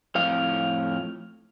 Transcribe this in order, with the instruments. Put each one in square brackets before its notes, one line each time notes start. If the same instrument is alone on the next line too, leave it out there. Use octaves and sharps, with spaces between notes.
[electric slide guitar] F2 A2 F5